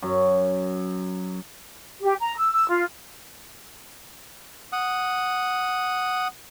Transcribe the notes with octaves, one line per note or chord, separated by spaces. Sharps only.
F#2
G4
A#5
E6
E6
F4
F#5 D#6